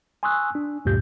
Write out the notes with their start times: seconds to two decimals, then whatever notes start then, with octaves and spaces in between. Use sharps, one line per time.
0.23 G#5 C6 C#6 D#6 E6 F#6
0.55 D4
0.85 D2 G2 A#2 G4 G6